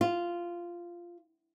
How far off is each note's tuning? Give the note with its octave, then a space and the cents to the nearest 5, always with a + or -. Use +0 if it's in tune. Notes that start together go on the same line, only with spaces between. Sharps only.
F4 -10